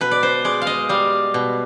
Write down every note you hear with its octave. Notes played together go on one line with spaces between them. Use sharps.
B2 B4
D5
C5
G#3 D5
F5
D#5
G3 F5
B2